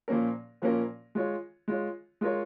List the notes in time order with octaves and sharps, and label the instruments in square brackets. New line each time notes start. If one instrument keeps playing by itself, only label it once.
[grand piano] A#2 F3 A#3 C#4 A#4
A#2 F3 A#3 C#4 A#4
G#3 F4 C#5
G#3 F4 C#5
G#3 F4 A#4 C#5